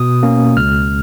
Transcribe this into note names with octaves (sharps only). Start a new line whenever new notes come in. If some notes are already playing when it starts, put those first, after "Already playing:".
Already playing: B2 D#6
A#3 C#4
C#2 F6